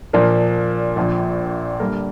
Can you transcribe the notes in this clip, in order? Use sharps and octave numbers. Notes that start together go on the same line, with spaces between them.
A#2 F3 D4 A#4
A#1 A#2 F3
D3 G3 A#3 D4 A#4